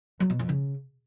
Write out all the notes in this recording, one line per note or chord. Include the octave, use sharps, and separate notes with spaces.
F#3
B2
F2
C#3